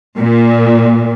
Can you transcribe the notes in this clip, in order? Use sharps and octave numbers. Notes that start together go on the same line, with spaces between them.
A#2